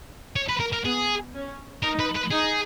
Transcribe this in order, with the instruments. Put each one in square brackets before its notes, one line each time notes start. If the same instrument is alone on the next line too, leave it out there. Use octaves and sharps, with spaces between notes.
[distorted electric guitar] C#5
B4
A#4
A#4
[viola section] B3 [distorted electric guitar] G#4
[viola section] C#4
[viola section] D#4 [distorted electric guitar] A#4
[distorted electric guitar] B4
B4
[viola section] D#4 [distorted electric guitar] G#4